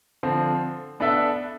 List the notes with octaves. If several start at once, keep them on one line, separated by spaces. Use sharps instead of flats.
D3 F3 C4
B3 D4 A4 E5